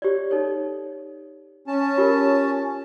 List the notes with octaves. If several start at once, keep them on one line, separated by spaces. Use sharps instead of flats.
G4 C#5 D5
D#4 A4 C#5
C#4 A5
F4 G4 A#4